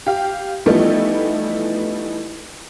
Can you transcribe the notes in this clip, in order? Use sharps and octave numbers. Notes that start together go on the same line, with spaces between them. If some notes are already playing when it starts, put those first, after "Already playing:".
G4 F5
E3 F3 G3 A3 B3 D#4